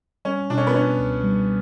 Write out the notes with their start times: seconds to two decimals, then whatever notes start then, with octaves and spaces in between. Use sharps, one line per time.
0.25 G3 C#4
0.50 B2 D4
0.58 C#4
0.67 B3
0.75 C#4 D4
0.99 C#2
1.24 G3